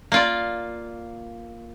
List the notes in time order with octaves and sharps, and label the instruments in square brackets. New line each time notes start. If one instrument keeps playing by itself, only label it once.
[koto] A#3 F4 D5